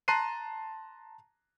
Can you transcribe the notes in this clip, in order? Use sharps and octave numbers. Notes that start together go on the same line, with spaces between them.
A5 A#5 C6 F#6 C7 D#7